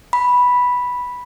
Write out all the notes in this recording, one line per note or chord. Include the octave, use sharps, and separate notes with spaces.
B5